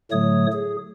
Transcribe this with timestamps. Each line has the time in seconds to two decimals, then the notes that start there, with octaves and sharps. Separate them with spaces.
0.12 A2 D3 F#3 A3 C#5 D#6
0.52 G#4